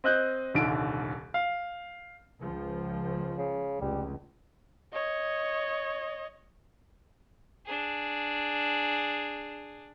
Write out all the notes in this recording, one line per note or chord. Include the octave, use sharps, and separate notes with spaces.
C4 D#5 F#6 G6
D#1 C2 D3 D#3 D7
F5
C#2 F3
C#3
F1 C#2 G3
C#5 D#5
D4 G#4